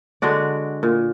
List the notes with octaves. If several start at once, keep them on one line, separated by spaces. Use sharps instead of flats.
D3 G#3 F#4 D5
A#2